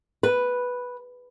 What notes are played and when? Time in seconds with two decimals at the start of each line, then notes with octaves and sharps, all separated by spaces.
0.23 B4